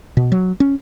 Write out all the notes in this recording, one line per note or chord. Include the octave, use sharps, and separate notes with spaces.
B2
F#3
C#4